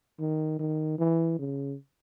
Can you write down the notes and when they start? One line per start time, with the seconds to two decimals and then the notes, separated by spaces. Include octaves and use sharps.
0.20 D#3
0.59 D#3
0.99 E3
1.39 C#3